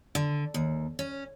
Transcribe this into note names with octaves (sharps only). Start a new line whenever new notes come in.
D3
D#2
C#4